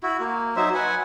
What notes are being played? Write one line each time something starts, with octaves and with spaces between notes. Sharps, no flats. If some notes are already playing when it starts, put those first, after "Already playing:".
E4 F#4
A#3
F#3 D#4 C5 E5
B4 F#5 G#5